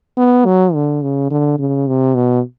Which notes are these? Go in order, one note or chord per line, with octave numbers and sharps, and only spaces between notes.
B3
F#3
D3
C#3
D3
C#3
C3
B2